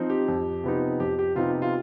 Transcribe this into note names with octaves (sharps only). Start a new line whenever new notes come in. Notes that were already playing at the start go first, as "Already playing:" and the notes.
Already playing: F3 C4 D#4
G4
F2
C3 F3 B3 D#4
F2 G4
G4
C3 F3 B3 D#4 F4
F4